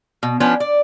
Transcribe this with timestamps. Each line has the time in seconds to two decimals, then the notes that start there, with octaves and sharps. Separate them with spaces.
0.23 B2
0.40 F3 B3 C#4 D4
0.60 D5